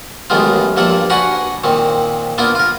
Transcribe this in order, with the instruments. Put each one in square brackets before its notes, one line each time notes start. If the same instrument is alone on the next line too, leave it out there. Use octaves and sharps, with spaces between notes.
[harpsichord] A1 F#2 D#3 G#3 B3 F4
G2 F3 A#3 A4 D5
D4 F#4 B4 F#5 G#5 A#5
A#2 D#3 C4
A#3 B3 D4 E4 F4
F4 A#4